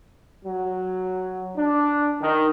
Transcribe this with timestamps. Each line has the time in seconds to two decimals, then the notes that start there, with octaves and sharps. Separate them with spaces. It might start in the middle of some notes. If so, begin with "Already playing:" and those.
0.44 F#3
1.56 D4
2.20 D#3